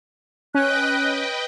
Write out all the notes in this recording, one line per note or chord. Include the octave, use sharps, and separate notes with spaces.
C#4 B4 D#5 G5 F#6